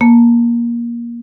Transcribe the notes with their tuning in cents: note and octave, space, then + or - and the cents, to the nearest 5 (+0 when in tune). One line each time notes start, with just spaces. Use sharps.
A#3 +20 A5 +0